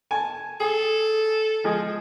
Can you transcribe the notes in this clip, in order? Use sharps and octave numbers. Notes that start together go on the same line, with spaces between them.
G#5 A5
G#4 A4
F3 G#3 G#4